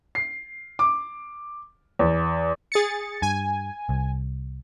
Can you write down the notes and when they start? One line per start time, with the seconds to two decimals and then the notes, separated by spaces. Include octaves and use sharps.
0.15 C7
0.79 D6
1.99 E2
2.72 G#4 A6 C#7
3.22 G2 G#5
3.89 C2